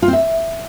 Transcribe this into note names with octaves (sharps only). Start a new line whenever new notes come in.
F4
C4
E5